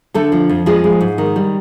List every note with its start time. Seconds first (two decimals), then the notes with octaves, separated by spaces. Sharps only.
0.14 D3 A3 A4
0.32 F3
0.49 F2
0.66 F3 G#3 G#4
0.84 G#3
1.01 G#2
1.18 D#3
1.36 G3